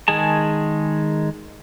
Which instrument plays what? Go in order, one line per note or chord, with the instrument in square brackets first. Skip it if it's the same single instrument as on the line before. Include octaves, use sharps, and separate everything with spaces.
[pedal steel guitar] D#3 G#3 G#4 A5